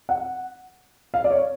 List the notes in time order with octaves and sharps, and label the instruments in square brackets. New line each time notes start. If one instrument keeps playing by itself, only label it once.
[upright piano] F#5
F5
D5
C#5